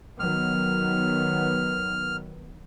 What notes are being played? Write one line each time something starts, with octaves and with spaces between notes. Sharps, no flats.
D#3 F#3 B3 F6